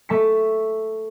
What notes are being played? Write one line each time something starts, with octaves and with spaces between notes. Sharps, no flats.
A3 A5 C#6 B6 C#7